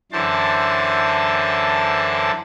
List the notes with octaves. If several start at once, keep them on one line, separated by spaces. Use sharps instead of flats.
F#2 D3 E3 C5 A5